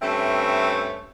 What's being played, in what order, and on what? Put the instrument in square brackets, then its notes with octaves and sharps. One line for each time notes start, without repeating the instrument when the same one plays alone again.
[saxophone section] G2 A3 C4 C#4 C#5 E5